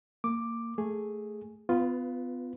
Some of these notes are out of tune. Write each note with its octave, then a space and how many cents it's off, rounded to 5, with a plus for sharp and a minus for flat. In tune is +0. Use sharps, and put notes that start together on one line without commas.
A#3 -20 D6 +5
A3 +0 G#4 +0
B3 +30 F4 +0 B4 +0